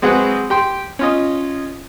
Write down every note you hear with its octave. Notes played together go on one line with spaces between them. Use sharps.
G#3 C4 F#4 G#4 B4 F#5
G4 G5 C6
C#4 F4 D#5